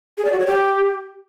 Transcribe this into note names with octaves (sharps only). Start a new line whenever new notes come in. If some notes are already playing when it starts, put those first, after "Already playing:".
G#4
D5
F#4
C#5
G4